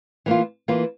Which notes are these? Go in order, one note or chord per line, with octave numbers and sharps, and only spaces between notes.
E3 A#3 F4
E3 A#3 F4